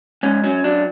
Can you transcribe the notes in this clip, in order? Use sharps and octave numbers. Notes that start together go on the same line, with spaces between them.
G#2 C#4
F#3 C#4
F#3 D4